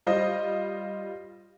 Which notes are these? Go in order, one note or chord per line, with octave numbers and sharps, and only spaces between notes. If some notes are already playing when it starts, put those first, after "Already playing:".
G3 F4 C5 D#5